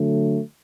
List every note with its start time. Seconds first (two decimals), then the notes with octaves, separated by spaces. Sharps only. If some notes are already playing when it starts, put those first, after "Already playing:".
Already playing: D3 F#3 A3